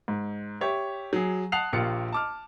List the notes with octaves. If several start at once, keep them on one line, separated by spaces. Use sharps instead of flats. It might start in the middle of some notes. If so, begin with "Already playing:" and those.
G#2
G4 C#5 E5
F#3 G#4
F#5 A5 D#6 F#6 C7 F7
A#1 A#3 F4 G4 C#7
A5 D6 F6